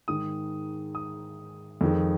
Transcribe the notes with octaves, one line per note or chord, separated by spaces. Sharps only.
G#2 D#3 G#3 D#6
D#6
F2 D#3 G#3